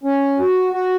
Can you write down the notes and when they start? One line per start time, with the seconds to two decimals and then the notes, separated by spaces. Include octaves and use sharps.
0.03 C#4
0.39 F#4
0.72 F#4